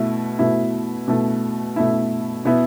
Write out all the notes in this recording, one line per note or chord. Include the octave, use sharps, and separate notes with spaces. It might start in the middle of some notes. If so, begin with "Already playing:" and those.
Already playing: B2 A3 E4
B2 A3 E4
B2 A3 E4
B2 A3 E4
B2 B3 E4